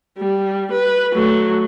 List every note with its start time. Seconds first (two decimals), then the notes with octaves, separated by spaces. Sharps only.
0.18 G3
0.71 B4
1.13 F#3 A3